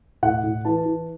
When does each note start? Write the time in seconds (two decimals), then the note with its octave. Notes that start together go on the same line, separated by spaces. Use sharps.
0.23 A2 F#5
0.44 A2
0.65 E3 A5
0.86 E3